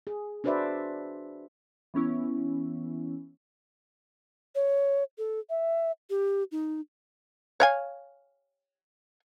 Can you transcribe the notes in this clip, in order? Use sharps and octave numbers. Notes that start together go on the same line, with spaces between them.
G#4
D4 F#4 B4 C5 D5 E5
E3 B3 C#4 E4
C#5
A4
E5
G4
D#4
C#5 F5 G#5